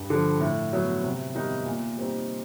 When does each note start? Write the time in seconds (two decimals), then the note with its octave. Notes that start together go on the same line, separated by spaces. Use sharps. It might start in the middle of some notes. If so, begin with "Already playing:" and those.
Already playing: G2
0.10 D3 F3
0.40 A2
0.73 F#3 B3
1.03 C3
1.35 D#3 G3 B3 D#4
1.66 A#2
1.97 G3 C4 D#4